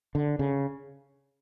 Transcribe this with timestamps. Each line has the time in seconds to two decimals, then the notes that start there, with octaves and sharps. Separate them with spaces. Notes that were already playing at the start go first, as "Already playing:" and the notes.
0.15 D3
0.39 C#3